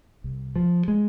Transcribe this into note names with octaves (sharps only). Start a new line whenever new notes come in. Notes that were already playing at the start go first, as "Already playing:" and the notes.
C2
F3
G#3